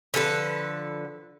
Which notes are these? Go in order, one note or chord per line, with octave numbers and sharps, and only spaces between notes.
D3 F3 A4 B4